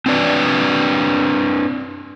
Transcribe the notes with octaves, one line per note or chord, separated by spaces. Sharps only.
C4 D4 B4 D5